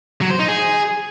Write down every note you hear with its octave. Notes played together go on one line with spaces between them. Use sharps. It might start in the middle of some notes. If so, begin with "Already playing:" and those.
F#3
C5
D#4
G#4